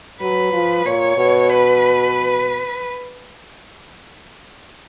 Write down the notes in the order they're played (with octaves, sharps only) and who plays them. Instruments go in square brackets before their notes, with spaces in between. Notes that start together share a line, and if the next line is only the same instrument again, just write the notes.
[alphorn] F#3 [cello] B4
[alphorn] F3
[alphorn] A#2 [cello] C#5
[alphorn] B2
[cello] B4